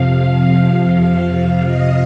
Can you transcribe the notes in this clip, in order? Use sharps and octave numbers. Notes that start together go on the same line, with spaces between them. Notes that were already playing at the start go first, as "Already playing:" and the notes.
Already playing: F2 C3 F3 F5
F5
F5
D#5